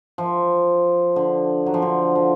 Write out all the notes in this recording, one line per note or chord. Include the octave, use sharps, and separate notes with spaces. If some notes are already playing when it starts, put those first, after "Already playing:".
F3
D3
F#3
F3
D3
F3